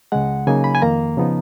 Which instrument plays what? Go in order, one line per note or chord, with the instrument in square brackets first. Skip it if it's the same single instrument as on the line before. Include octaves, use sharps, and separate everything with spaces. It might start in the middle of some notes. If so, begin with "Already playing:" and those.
[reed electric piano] C#2 C#3 G#3 F#5
C#3 F#3 A#3 D#4 G#5
B5
G#5
F2 D#3 A#3 A#5
C#3 F3 B3 D#4